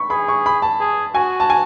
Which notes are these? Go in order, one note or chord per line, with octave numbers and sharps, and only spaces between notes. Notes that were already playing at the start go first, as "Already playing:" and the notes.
Already playing: B5 C#6
G#4 B5
C#6
B5
A5
G#4
F#4 G#5
A5
G#5